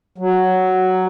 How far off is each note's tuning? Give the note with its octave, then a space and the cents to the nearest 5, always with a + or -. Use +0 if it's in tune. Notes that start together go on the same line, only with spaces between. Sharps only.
F#3 +5